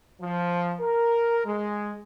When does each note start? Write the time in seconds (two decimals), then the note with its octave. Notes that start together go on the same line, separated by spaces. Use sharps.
0.21 F3
0.80 A#4
1.45 G#3